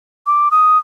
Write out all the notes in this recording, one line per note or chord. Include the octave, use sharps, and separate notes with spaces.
D6
D#6